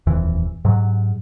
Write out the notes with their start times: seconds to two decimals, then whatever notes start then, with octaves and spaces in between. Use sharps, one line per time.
0.07 D#1 F2 E3
0.65 G#2 F#3